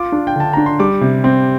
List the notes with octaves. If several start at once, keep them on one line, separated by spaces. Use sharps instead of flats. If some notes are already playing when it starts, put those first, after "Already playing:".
Already playing: F4 D6
D4
G5
D3 A5
D4 A#5
C6
G3 D6
C3
C4